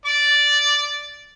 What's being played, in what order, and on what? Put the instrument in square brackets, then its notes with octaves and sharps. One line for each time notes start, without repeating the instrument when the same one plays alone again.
[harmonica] D5 D6